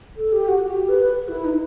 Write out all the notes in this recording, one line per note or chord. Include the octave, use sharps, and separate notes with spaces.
A4
G4
F#4
G4
B4
B4
E4
D#4